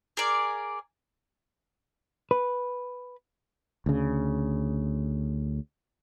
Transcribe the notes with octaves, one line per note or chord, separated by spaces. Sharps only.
G#4 A#4 D5
B4
D2 C#3